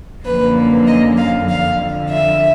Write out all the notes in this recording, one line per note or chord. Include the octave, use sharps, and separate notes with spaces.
F#2 D3 F3 A#3 B4
D#5
F5
F2 D3 F3 F5
E5